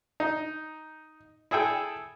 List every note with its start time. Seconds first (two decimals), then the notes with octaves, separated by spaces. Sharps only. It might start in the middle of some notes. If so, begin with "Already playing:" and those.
0.20 D#4
1.51 E4 G#4 A4 G5